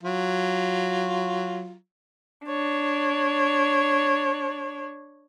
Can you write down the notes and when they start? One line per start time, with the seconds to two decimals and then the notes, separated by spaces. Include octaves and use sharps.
0.03 F#3 F4
2.45 D4 C#5